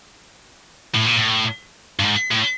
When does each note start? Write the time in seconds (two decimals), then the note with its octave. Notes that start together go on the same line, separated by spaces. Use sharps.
0.95 A2
1.06 A#2
1.17 A2
2.00 G2
2.04 G#2
2.31 A2